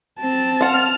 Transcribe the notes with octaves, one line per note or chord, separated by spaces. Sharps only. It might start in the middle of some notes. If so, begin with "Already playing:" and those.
C4 A5
F4 F#5 F6